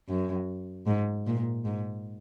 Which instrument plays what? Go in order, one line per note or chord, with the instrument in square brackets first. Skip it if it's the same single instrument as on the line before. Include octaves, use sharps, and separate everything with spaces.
[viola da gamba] F#2
G#2
A#2
G#2